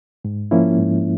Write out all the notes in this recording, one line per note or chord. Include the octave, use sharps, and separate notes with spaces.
G#2
F3 A#3 C#4 E4
G#2